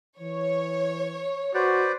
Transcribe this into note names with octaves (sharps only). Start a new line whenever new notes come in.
E3 C#5
F#4 B4 C5 D5